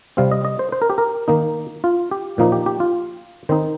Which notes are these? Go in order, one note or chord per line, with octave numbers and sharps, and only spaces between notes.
C3 G3 C4 F5
D#5
D#5
C5
C5
A#4
G4
A#4
D#3 A#3 D#4
F4
G4
A#2 F3 A#3 D#4
G4
G4
F4
D#3 C4 D#4 C5